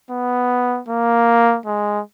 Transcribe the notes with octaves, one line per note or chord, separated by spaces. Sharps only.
B3
A#3
G#3